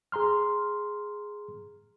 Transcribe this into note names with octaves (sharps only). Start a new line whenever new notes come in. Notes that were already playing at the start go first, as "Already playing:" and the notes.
G#4 A#5 C6 F6